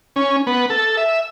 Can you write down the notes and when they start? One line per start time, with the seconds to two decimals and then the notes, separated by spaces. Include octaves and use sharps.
0.16 C#4
0.47 B3
0.70 A4
0.97 E5